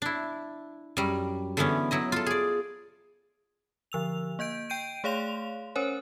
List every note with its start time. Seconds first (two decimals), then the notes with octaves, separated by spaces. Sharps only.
0.02 D4 E4
0.97 F#2 G3
1.57 D3 E3 B3 C#4
1.91 F#3 E4 D#5
2.12 F4 A4
2.26 G#4 D5
3.92 D3 F3 E6 F7
4.39 A#3 D#5 G6 D7
4.70 G5 G6 D7 D#7
5.04 A3 G#4 C#5 F5 C6 F7
5.75 C#4 A#4 C5 C#5 G#5